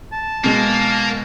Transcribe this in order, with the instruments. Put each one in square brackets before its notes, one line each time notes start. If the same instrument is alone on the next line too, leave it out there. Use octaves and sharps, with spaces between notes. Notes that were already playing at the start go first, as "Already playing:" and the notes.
[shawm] A5
[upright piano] B2 G#3 [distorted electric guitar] A#3